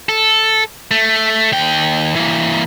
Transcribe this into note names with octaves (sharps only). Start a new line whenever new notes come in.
A4
A3
D#2 G5
E3 A#3